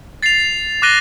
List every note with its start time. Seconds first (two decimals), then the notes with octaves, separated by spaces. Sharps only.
0.23 A6 C7 F7
0.82 D6 F#6 A#6 D#7 G7